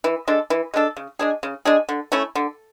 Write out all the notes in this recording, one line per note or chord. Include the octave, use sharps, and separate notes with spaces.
E3
G#3 D4 A4
E3
G#3 D4 A4
C#3
G#3 D4 G#4
C#3
G#3 D4 G#4
D3
A3 C#4 E4
D3